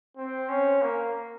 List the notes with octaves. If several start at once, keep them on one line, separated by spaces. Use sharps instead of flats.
C4
C#4
A#3